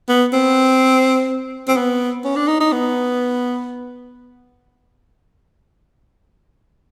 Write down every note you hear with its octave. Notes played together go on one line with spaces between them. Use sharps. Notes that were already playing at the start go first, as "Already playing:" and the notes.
B3
C4
C4
B3
C#4
D4
D#4
D#4
B3